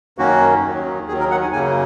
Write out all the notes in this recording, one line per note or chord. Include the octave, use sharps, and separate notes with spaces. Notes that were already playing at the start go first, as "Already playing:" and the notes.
F#2 D#3 A#3 C#4 F#4
D#2 D#3 F#3
D#2 D#3 F#3 G#4
A#4
F#5
G#5
F#2 C#3 F#3 A#3 G#5